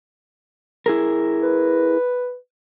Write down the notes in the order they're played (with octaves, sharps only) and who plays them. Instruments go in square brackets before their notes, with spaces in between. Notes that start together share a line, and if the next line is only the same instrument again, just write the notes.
[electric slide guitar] E4 G#4 A#4
[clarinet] B4